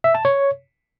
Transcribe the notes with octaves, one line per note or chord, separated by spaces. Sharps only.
E5
A5
C#5